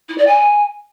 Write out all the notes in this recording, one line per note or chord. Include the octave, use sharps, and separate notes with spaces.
E4
D5
G#5